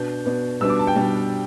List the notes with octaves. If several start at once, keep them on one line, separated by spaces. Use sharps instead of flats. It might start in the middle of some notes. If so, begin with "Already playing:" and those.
Already playing: B2 B3 D4 G6
B2 B3 D4
B2 G3 B3 D4 E6
D6
A5
G5
B2 G3 B3 D4